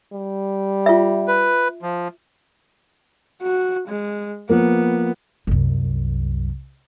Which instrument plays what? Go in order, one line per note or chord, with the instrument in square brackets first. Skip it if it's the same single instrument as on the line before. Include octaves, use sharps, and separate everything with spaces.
[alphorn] G3
[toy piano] F4 E5
[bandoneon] B4
F3
[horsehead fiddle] F#4
G#3
[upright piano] F3 A#3 [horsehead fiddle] B3
[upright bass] C2 F#2